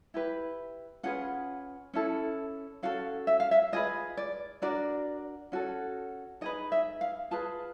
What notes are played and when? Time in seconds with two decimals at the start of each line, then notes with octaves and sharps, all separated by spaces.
0.14 E4 G4 B4
1.03 C#4 F4 G#4 B4 F#5
1.94 C#4 E4 A4
2.83 C#4 F#4 A4 F5
3.27 E5
3.40 F5
3.51 E5
3.72 F4 G#4 B4 D#5
4.17 D5
4.62 D4 F#4 A#4 D5
5.52 C#4 F#4 A4
6.41 D#4 G#4 B4 D#5
6.72 E5
7.01 F5
7.31 F4 G#4 B4 A5